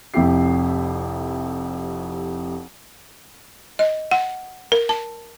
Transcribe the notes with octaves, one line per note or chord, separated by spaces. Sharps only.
F1 F2 C3 E4 G4 C7
D#5
F#5
A#4
A5